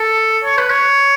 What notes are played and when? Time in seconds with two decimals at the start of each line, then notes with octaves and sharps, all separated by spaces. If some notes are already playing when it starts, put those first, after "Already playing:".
Already playing: A4
0.44 C#5
0.57 B4
0.70 C#5